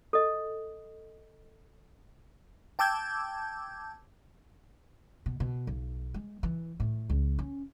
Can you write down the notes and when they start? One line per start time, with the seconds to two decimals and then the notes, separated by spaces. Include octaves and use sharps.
0.13 A4 D#5
2.79 G5 A5 D6 E6 G6 G#6
5.26 B2
5.40 B2
5.67 B1
6.14 G#3
6.43 E3
6.80 A2
7.10 C#2
7.39 C#4